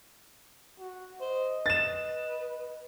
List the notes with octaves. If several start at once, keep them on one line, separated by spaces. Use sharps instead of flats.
F#4
C5 D#5
B4 A6 E7